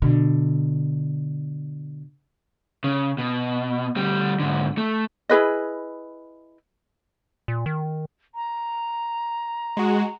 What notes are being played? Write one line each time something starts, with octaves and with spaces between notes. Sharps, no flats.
B2 D3
C#3
B2
D2 G3
G#2 D3
A3
E4 G#4 B4 D#5
A#2
D#3
A#5
G#3 F#4